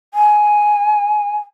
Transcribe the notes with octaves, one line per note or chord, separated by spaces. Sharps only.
G#5